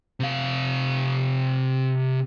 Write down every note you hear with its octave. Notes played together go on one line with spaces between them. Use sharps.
C3 F5